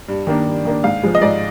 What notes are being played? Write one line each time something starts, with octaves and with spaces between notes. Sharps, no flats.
G2
D#3 A#3 D4
G2
D#3 A#3 D4
G#2 F5
F3 G#3
D#5
G#2 D5